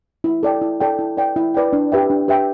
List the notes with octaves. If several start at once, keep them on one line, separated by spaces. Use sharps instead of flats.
E4
A4 D5 G5
E4
A4 D5 G5
E4
B4 D5 G5
E4
B4 D5 G5
D4
G4 B4 E5 G5
D4
G4 B4 E5 G5